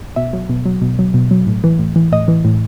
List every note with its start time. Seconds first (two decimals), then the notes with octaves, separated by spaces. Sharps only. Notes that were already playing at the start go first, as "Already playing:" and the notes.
0.16 B2 E5
0.33 F#3
0.49 B2
0.66 F#3
0.82 B2
0.99 F#3
1.14 B2
1.31 F#3
1.46 A2
1.64 E3
1.79 A2
1.96 E3
2.12 A2 D#5
2.28 E3
2.45 A2